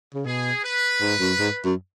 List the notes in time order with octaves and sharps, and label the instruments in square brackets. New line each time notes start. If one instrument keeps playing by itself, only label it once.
[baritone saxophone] C#3
[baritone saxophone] B2 [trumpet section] G#4
[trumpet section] B4
[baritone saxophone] G#2
F#2
G#2
F#2